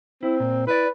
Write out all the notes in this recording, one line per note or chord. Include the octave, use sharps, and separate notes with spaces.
C4 E4
A#2
E4 B4 D5